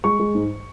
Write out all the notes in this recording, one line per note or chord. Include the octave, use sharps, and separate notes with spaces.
G#3 C#6
G#3
G#2